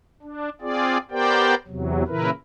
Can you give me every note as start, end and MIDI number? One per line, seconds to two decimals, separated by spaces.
0.22 0.49 62
0.61 0.98 60
0.61 0.98 65
0.61 0.98 68
0.61 0.98 74
1.11 1.54 59
1.11 1.54 67
1.11 1.54 70
1.11 1.54 72
1.11 1.54 74
1.11 1.54 79
1.68 2.03 40
1.68 2.03 48
1.68 2.03 54
2.07 2.30 46
2.07 2.30 49
2.07 2.30 52
2.07 2.30 64
2.07 2.30 70
2.07 2.30 71